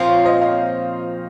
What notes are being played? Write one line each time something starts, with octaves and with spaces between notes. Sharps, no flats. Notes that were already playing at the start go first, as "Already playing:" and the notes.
Already playing: A#2 F3 C4 F4 C5
C#5
C5 D#5
C#5 F5